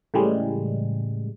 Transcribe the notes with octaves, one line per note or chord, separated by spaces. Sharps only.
A2 C#3 E3 G3 G#3